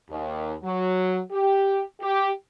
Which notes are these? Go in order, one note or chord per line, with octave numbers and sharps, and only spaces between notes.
D#2
F#3
G4
G4